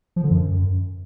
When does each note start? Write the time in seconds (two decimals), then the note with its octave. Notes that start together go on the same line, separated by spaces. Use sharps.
0.16 F3
0.24 D3
0.31 F#2